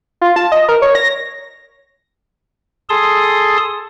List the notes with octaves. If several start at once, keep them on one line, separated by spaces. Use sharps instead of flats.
F4
A5
D#5
A#4
C#5
A#6
G#4 A4 A5 C6 D#6